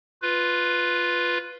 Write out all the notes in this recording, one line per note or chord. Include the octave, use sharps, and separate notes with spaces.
F4 B4